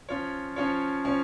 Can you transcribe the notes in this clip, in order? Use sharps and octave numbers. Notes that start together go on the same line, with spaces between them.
F3 C#4 F4 C#5
F3 C#4 F4 C#5
F3 C#4 F4 C#5